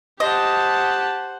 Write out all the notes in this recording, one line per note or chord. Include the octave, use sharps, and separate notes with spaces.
G4 C5 D#5 F#5 A5